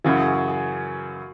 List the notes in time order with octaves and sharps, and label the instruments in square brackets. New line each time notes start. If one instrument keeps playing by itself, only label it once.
[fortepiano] F#2 C#3 E3 [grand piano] F#4
[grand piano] G#4
G#4
G#4